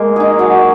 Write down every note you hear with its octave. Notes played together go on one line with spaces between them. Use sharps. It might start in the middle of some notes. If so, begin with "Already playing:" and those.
Already playing: G#3 A#3
D#4 G#4
F#3